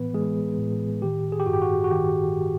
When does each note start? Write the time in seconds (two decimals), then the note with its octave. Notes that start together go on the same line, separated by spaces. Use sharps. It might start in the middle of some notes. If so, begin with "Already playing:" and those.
Already playing: A2 E3 B3 B4
0.14 E3 G#3 G#4
0.58 A2
1.02 D#3 G4
1.32 G#4
1.40 G4
1.46 G2 F#4
1.53 G4
1.62 F#4
1.84 F#4
1.91 D#3 G4